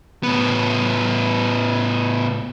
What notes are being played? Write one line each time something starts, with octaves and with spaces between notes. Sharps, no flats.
A2 B3